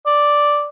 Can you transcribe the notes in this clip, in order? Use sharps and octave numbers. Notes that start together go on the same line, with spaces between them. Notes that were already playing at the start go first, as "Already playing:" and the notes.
D5